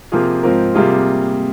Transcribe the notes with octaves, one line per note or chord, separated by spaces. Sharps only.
C3 F3 A#3 F4 G#4
G#2 F3 C4 F4 A#4
C3 G3 A#3 F4 G#4